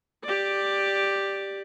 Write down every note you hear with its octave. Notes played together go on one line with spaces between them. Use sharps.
G4 D5